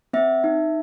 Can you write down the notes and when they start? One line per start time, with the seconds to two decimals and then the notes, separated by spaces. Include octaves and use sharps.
0.13 C4 E5
0.44 D#4